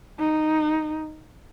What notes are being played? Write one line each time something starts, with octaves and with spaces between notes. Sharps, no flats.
D#4